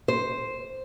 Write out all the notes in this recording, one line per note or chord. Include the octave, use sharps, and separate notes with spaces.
C5